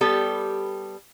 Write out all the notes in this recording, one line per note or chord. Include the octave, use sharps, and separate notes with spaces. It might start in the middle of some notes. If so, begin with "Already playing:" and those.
G3 B3 G4 A4